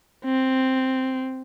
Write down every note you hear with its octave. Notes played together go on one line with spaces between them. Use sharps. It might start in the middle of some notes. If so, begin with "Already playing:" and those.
C4